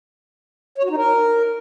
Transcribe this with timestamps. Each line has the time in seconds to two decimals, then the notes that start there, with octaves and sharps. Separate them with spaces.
0.78 C#5
0.84 F#4
0.90 D#4
0.97 A#4